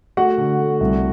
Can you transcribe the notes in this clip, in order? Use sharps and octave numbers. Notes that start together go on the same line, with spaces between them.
A3 F#4 F#5
D3
A3
C2